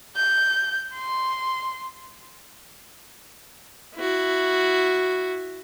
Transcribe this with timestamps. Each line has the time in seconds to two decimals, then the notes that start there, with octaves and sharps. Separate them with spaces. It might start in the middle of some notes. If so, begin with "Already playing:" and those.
0.17 G6
0.95 C6
3.95 E4 F#4